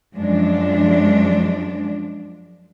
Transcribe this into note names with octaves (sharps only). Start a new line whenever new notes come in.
F#2 F3 G#3 D4